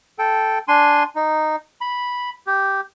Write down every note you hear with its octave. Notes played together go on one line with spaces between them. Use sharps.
A4 G5
D4 G#5 C6
D#4
B5
G4